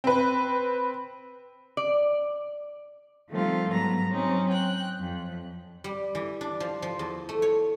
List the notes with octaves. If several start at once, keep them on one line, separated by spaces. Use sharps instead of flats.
C4 B4
D5
D#3 F3 G3 A3 C4 F4
G#2 F#3 B3 A#5
F#3 C4 C#4 D#4
G5 F#6
F2
G3
E3
D4
F3
F3
E2
A3
C#5